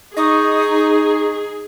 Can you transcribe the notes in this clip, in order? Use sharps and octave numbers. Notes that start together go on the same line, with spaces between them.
D#4 G#4 D#5 C#6 D#6